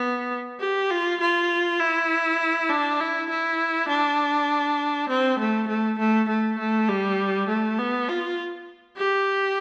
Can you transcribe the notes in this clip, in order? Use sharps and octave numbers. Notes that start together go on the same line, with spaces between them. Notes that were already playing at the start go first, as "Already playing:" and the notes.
Already playing: B3
G4
F4
F4
E4
D4
E4
E4
D4
C4
A3
A3
A3
A3
A3
G3
A3
B3
F4
G4